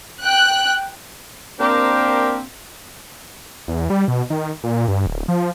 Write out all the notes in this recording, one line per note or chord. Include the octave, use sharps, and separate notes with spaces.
G5 F#6
A#3 C4 D4 G4 A#4 C5
E2
G3
B2
D#3
A#2
G2
D1
F3